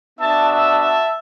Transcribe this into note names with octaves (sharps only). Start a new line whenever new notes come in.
B3 D4 F#4 E5 A5
E5 A5
E5 A5